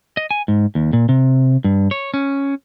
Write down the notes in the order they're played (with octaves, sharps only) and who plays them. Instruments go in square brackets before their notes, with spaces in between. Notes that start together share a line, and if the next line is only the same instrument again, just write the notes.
[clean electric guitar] D#5
G#5
G#2
D#2
A#2
C3
G2
C#5
C#4